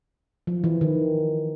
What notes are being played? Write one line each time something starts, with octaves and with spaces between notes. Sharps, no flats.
F3
E3
D#3